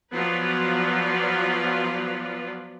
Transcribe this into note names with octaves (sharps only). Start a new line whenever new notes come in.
F3 F#3 B3 F4 B4 D5